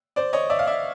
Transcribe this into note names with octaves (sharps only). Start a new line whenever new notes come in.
C5 D5
C#5 D#5
D5 E5
F5
D5 E5